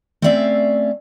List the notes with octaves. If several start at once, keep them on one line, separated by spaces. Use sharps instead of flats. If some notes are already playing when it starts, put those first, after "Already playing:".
A3 C4 C#4 D5 E5 F5